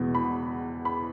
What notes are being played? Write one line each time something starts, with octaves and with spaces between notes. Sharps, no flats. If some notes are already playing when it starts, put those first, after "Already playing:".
Already playing: E2 B2 G#3 B3
B5
B5